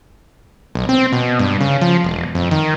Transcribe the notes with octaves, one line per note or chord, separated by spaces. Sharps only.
B1
C4
B2
G2
C#3
F3
E1
F2
D#3